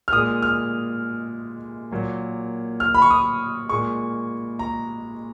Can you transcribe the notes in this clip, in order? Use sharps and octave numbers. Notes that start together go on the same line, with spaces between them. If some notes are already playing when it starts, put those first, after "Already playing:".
F6
A#2 G#3 D#6
F6
A#2 F#3 A#3
F6
B5
C#6
D#6
A#2 G#3 C#6
A#5